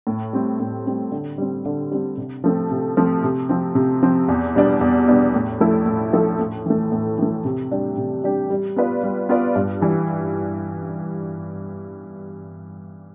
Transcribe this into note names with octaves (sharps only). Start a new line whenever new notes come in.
A2
G3 C4
A2
G3 C4
D3
G3 C4
D3
G3 C4
C3
F3 A3 C4
C3
F3 A3 C4
C3
F3 C4
C3
F3 C4
E2
B2 G3 B3 D4
E2
B2 G3 B3 D4
A2
F3 A3 E4 A4
A2
F3 A3 E4 A4
A2
E3 A3
A2
E3 A3
C3
G3 D4 G4
C3
G3 D4 G4
G3
B3 F4 B4 D5
G3
B3 F4 B4 D5
G2
E3 G3